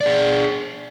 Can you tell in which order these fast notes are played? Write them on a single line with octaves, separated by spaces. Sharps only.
D5 D4 G#4